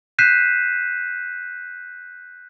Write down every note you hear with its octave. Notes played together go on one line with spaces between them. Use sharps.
F#6 G6 B6 C7 D#7 E7